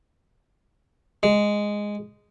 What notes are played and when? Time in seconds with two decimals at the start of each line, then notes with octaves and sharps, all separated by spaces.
1.23 G#3